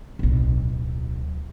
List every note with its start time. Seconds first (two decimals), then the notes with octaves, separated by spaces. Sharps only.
0.19 D1 B1